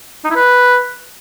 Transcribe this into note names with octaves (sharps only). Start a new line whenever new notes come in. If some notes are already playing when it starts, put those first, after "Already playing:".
D#4
E4
B4